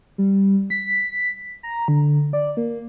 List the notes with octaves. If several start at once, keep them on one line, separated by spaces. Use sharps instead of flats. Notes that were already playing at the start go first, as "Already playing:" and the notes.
G3
B6
A#5
D3
D5
A#3